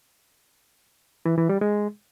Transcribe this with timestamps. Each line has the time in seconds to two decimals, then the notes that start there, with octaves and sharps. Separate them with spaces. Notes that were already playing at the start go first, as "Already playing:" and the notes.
1.26 E3
1.37 E3
1.49 G3
1.61 G#3